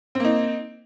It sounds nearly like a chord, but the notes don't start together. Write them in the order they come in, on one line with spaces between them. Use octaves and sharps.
C4 A#3 D#4